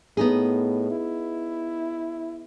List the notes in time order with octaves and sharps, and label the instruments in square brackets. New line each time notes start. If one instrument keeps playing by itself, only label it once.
[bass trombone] A2 [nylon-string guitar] B3 D#4 G#4
[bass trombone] E4